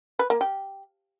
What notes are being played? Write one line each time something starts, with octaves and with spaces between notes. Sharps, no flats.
B4
A#3
G4